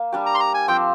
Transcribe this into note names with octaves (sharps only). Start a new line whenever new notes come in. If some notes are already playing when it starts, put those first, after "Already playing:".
Already playing: A#3
G3 D4 G4
A#5
C6
A#5
G#5
F3 C4 G4 C5 G5